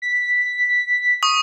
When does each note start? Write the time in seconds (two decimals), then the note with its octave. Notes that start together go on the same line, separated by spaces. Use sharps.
0.02 B6
1.23 C#6 D#6